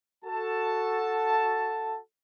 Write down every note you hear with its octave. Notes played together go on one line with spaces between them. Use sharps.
F#4 A4 A5